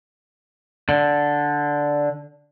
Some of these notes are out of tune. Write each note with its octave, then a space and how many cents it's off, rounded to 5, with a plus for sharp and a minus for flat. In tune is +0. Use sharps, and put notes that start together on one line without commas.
D3 -5